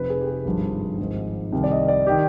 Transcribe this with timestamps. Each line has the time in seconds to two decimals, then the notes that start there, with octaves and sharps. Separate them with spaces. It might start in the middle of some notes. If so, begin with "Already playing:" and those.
Already playing: F1 F2 C3 B4
0.10 G#4
0.21 G4
0.27 G#4
0.45 G#1 G2 F3
0.99 G#1 G#2 F3
1.52 C2 C3 D#3
1.63 D5
1.71 D#5
1.88 D5
2.07 D#3 G4